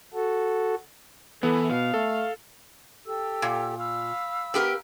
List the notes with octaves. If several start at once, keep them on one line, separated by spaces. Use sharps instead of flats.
F#4 A4
E3 B3 A4
B2 F5
A3 A4
G4 A4 E6
A#2
F5 B5 E6
B3 G4 A#4